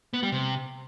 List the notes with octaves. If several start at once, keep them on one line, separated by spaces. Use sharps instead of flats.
B3
G3
C3